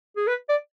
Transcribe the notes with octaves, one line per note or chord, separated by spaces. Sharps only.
G#4
B4
D5